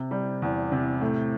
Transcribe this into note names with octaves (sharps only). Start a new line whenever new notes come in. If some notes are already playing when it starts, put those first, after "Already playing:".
Already playing: C3
G3
E2
C3
A2